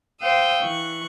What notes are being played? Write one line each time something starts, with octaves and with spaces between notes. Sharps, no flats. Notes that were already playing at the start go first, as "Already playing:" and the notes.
C5 F5 G5 D#6 E6
E3 C#6 F#6